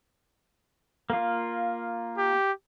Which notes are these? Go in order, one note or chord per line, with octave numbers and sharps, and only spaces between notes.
A#3 F4
G4